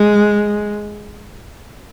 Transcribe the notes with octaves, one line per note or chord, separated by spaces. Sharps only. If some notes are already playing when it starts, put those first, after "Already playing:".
Already playing: G#3